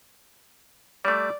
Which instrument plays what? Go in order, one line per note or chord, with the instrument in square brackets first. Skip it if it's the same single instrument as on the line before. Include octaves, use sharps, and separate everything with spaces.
[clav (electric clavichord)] G3 A3 [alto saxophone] D5